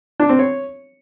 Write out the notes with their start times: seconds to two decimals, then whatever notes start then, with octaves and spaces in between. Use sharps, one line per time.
0.20 D4
0.29 C4
0.39 C#5